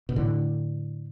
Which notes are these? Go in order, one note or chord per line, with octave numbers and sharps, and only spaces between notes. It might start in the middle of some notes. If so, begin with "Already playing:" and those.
B2
A2 D3